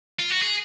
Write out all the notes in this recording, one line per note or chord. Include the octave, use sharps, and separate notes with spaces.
F4
F#4
G#4